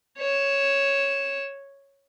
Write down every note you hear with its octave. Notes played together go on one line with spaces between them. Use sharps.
C#5 E7